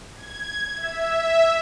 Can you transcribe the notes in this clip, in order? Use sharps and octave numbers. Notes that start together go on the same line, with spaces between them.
G#6
E5